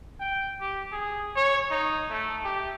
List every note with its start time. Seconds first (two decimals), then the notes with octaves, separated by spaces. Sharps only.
0.20 G5
0.61 G4
0.92 G#4
1.36 C#5
1.71 D#4
2.10 A3
2.44 G4